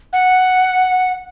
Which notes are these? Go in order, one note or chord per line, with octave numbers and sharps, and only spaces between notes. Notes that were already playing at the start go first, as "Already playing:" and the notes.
F#5